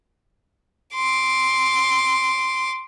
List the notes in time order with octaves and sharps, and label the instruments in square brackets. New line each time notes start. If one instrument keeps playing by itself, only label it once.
[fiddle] C6 D6